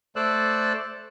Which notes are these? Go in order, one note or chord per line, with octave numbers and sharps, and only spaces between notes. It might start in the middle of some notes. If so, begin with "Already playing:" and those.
A3 A4 C5 D5 E6 F#6